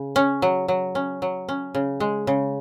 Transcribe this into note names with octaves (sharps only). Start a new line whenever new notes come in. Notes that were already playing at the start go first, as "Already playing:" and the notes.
Already playing: C#3
C#4
F#3
F#3
C#4
F#3
C#4
C#3
G#3
C#3